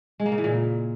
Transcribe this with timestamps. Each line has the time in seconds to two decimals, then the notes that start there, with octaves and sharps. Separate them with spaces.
0.20 G#3
0.26 A#3
0.32 C#3
0.38 E3
0.44 A#2